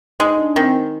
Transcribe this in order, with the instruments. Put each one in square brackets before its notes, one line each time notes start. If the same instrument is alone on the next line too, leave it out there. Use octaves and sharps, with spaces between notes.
[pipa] G#3 [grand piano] D#4
[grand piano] D4
[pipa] D#3 [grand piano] C4